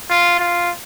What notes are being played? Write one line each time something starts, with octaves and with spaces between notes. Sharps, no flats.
F4
F4